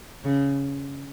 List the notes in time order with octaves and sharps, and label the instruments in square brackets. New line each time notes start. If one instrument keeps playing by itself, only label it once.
[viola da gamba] C#3